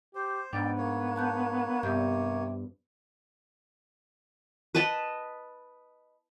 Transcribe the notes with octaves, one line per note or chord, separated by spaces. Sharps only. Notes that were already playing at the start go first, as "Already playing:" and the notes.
G4 C5
G#2 B3 D4 D5 G5
A#3 C#5
A5 F#6 G6
G2 C3 B3 G6
B4 D#5 A5 B5